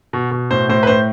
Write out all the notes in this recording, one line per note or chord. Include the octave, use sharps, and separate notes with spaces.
B2
B2
A2 C5
A2 C5
B4
A2 C5